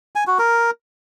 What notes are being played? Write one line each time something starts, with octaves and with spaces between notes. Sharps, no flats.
G#5
F#4
A#4